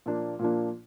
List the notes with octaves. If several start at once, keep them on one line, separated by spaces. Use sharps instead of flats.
A#2 F3 A#3 D4
A#2 F3 A#3 D4